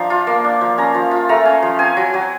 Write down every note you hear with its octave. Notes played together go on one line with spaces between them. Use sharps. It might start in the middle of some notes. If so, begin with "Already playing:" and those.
Already playing: F3 D4 A#5
F4
A#3
D4
F3
C#4 A#5
F3
F4
A3 A#5
C#4
F3
C4 G#5
F#3
F#3